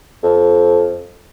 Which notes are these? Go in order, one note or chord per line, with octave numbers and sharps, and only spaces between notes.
F2